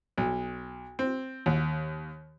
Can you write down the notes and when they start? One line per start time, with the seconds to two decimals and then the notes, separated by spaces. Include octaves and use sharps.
0.18 B1
0.99 C4
1.46 D#2